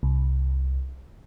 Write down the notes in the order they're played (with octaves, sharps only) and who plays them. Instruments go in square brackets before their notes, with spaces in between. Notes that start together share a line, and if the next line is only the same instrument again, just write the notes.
[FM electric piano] C2